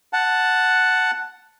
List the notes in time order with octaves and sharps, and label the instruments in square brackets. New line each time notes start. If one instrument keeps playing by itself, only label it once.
[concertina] F#5 A5